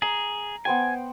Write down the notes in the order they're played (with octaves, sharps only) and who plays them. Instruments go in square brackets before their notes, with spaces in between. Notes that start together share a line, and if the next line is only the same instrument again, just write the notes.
[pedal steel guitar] G#4 [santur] A#5
[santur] B3 C5 G5 [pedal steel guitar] G#5